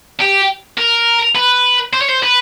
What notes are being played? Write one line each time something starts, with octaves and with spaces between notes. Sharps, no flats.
G4
A#4
B4
C5
C#5
C5
B4